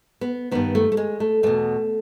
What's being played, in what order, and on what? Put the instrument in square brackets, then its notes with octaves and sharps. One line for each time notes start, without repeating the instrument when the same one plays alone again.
[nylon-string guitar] B3
G2 D#3 B3
A3
A3
G#3
A3
E2 B2 A3